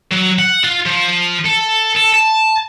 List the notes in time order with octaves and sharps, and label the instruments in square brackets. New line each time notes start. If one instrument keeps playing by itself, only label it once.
[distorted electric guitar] F#3
F#5
F4
F3
A4
A4
A5